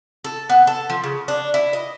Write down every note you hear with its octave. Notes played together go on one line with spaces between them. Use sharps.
A4
B3
A4
F3
C#3
D4
E4
D#5